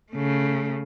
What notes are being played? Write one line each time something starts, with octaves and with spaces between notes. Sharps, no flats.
C#3 A3